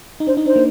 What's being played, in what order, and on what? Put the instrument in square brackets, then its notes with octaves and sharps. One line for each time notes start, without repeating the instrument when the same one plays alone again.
[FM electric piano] D#4
[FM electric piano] D4 [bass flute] C5
[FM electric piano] D#4
[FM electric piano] D4 [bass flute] C5
[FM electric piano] A#3